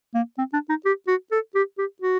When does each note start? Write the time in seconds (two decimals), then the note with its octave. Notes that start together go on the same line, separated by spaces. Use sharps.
0.14 A#3
0.38 C4
0.53 D4
0.69 D#4
0.85 G4
1.07 F#4
1.31 A4
1.55 G4
1.78 G4
2.01 F#4